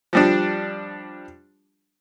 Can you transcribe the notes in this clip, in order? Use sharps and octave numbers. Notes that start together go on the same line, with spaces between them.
F3 G3 D4